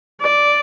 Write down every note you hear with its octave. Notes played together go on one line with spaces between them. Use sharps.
D5